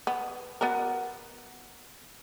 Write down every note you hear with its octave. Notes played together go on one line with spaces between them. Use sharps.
B3
B3 F#4 A#4